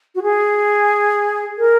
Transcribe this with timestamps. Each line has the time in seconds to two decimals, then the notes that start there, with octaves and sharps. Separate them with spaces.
0.15 F#4
0.22 G#4
1.58 A#4